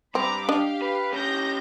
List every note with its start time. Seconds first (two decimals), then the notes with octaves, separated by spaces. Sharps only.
0.15 G2 C4 A#5 B5 D6
0.49 D4 G4 D#5 F5
0.82 B4
1.13 C#4 G4 G6 A#6